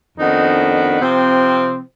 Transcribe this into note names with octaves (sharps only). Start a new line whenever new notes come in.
F2 D#3 B3 D4 D#4
C3 F3 C4